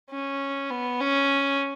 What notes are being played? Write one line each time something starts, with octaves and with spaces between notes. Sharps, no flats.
C#4
B3
C#4